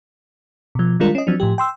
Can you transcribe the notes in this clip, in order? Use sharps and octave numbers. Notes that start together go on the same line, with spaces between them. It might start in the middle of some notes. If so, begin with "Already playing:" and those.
B2 F3
D#3 G3 G#3 D4 F4 A#4
C#4 D#5
F3 F#3 C4 D4
A2 F3 G4
G5 C6 E6